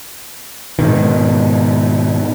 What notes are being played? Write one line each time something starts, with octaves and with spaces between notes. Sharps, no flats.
G#2 B2 D#3